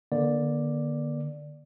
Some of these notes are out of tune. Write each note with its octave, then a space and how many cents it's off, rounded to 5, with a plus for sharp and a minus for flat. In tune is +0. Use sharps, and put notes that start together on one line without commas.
D3 +15 A#3 +40 D5 +0